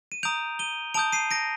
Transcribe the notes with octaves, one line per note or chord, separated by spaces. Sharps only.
D#7
A#5 D#6 G6 D7 F7
D#7 G7
A5 D#6 G6 D7 F7
C7 D#7
A#6 D7